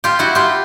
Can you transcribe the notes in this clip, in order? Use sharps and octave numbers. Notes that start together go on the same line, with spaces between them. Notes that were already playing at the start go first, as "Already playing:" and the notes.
F4 G4
E4 F#4
F4 G4